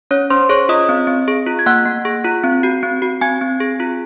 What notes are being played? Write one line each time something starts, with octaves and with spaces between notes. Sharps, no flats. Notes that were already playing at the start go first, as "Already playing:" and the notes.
C#4 C#5
C#4 C5 C6
G#4 C#5 C#6
F4 D#5 D#6
C4
C4
G#4
F4
G#6
A#3 F#5 F#6
A#3
G#4
F4
C4
F#4
C4
F#4
C4 G#5 G#6
C4
G#4
F4